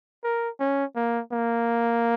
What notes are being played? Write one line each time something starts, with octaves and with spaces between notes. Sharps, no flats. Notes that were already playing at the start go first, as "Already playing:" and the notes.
A#4
C#4
A#3
A#3